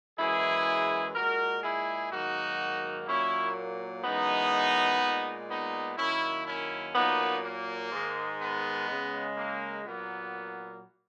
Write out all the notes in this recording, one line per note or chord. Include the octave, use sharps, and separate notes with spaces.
F#2 E3 G#3 E4 G#4
A#2 G#3 F#4 A#4
E4 G#4
G#2 D#3 F#3 A#3 D#4 F#4
A#2 F#3 A#3 C#4 E4
F#2 E3 G#3 B3 D#4
A#2 G#3
B3 D#4
F#2 D#3 A#3 C#4 E4
C#4 E4
A#2 F#3 A#3 B3 D#4
A#3
G#2 D#3 G#3
B3
C#3 G#3
A#3
A#2 F#3 A#3 B3